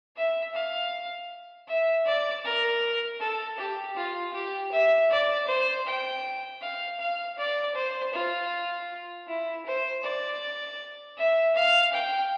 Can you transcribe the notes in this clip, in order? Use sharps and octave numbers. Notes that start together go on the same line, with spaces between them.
E5
F5
E5
D5
A#4
A4
G4
F4
G4
E5
D5
C5
G5
F5
F5
D5
C5
F4
E4
C5
D5
E5
F5
G5